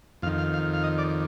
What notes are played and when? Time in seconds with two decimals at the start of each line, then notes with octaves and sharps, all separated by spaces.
0.22 F2 F5
0.26 D#3
0.38 F5
0.54 F5
0.73 F5
0.84 D#5
0.98 D5